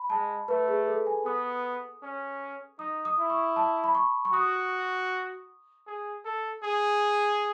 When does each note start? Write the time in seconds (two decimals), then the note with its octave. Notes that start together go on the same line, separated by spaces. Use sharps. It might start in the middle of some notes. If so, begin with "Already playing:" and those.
Already playing: B5
0.10 G#3 A5
0.48 A3 B4
0.68 G#4
0.87 A4
1.07 G#5
1.25 B3 D#6
2.03 C#4
2.79 D#4 D#6
3.05 D#6
3.18 E4
3.30 C#6
3.56 A5
3.84 B5
3.95 C#6
4.25 C#6
4.33 F#4 D#6
5.87 G#4
6.25 A4
6.64 G#4